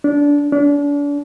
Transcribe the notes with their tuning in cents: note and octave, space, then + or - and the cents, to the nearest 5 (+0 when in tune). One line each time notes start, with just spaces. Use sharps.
D4 -20
D4 -35